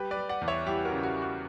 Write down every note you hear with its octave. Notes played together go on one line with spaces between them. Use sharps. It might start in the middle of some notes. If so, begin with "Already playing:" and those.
Already playing: G3 G4 B4
B4 D5
G3
D5 F#5
E2
C#5 E5
G3 E4 G4
F#4 A#4
C#3
F#4
G3
F#4